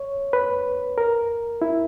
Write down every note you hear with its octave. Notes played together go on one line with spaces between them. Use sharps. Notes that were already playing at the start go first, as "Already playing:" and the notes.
Already playing: C#5
B4
A#4
E4